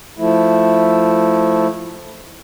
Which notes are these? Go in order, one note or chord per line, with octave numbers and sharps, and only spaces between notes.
F3 A3 E4